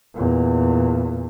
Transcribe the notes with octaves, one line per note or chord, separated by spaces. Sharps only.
E2 A#2